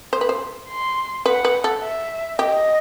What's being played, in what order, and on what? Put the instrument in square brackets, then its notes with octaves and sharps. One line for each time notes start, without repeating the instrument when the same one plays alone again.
[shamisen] C5
B4
C5
[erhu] C6
[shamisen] B4 [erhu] F#5
[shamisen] B4
A4
[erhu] E5
[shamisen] G4 [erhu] D#5